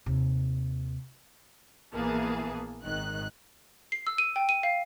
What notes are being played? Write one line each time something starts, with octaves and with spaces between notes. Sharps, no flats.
D#2 C3
A#1 E3 A#3 B3 G#4 A5
G#1 D#3 F#6
C7
E6
D#7
G5
D#7
F5